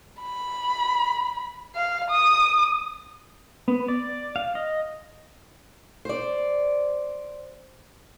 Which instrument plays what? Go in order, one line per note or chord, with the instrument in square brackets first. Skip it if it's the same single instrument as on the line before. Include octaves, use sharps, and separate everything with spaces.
[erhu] B5
F5
D#6
[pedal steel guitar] B3
D5
F5
D#5
[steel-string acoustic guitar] C5 D5